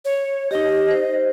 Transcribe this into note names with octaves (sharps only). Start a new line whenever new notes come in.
C#5
D#4 G4 D#5
C5